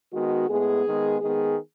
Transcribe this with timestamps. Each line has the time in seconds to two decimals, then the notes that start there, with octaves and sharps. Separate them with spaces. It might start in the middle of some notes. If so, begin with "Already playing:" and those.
0.14 D#3 G#3 B3 F#4
0.49 A2 G#3 B3 G#4
0.85 D#3 G#3 B3
1.21 D#3 G#3 B3 G#4